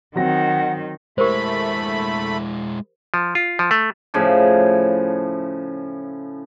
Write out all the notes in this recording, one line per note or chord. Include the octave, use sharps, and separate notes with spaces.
D#3 F#3 C4 F#5 A#6
G#3 A3 E4 G4 A#4 C5 B5
F3
F4
F3
A3
A2 C#3 F3